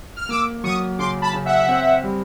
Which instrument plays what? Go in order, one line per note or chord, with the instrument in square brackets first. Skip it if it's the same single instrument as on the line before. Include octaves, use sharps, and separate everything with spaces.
[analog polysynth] F6
[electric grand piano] A#3 [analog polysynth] D6 E6
[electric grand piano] F#3 [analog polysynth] C#6 D#6
[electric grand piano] C#3 [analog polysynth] C6 D6
[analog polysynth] A5 B5
[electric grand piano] C#3
[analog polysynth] E5 F#5
[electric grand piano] C4
G3